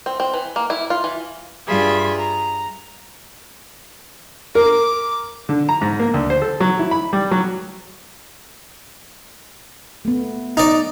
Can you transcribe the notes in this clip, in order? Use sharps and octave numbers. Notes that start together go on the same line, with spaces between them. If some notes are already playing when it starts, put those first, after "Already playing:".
C4
C4
E3
A#3
E4
F4
E3
G2 G3 F4 G#4 E5 B5
A#5
A#4 D6
D3
A#5
G#2
A#3
D2
C5
A4
F#3
E4
B5
G3
F#3
A3 B3
D#4 D5